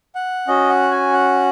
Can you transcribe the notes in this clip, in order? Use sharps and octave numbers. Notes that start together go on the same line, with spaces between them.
F#5
C#4 F#4 D#5
F#5
G#5
F#5